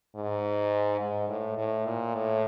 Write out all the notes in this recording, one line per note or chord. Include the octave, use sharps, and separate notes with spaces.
G#2
G#2
A2
A2
A#2
A2